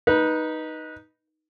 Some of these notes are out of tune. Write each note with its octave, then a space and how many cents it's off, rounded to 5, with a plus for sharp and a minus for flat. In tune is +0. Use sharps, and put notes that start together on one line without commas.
D#4 +0 B4 -20